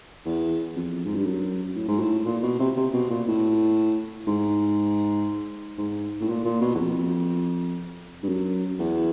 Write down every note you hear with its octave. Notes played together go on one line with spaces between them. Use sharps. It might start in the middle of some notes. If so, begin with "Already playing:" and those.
E2
F2
G#2
G2
F#2
A2
G#2
A2
A#2
B2
C3
C3
B2
A#2
A2
G#2
G#2
A2
A#2
A#2
B2
E2
F2
G2
F#2
E2